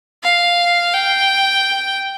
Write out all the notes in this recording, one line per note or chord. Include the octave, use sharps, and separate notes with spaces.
F5
G5